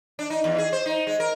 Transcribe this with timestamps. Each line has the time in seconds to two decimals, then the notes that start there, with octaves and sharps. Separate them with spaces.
0.19 D4
0.30 D#4
0.44 E2
0.58 G#4
0.73 C5
0.86 D#4
1.07 G#3
1.20 A#4